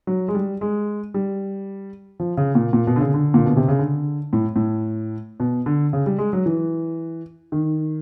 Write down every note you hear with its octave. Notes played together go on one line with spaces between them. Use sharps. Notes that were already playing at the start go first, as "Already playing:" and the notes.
F#3
G#3
G3
G#3
G3
F3
C#3
A#2
A#2
B2
D3
C#3
D3
A#2
B2
C3
C#3
D3
A2
A2
B2
D3
C#3
G3
G#3
F#3
E3
D#3